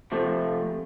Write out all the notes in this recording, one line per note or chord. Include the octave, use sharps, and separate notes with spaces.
C3 F3 A3